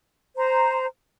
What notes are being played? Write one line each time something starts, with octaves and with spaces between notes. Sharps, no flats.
C5 A#5